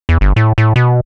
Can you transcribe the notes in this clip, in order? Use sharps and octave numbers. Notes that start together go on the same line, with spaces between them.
E2
G1
A2
A2
B2